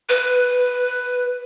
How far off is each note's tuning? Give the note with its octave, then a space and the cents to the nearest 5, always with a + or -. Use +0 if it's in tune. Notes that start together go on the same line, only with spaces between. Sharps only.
B4 +5